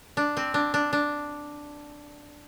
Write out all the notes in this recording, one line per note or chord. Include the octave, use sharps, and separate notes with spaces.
D4
C4
D4
D4
D4